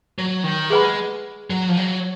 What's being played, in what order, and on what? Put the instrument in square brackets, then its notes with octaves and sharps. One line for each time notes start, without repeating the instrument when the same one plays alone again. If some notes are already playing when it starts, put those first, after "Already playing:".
[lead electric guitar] F#3
D#3
[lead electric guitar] G#3 [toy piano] G#4 B4 F#5 B5
[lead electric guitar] F#3
F3
F#3